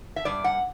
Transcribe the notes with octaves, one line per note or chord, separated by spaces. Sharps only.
E5
G2 D5
F#5